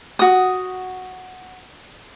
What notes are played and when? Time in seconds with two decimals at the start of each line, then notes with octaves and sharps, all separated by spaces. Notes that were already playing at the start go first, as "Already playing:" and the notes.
0.19 F#4 D#6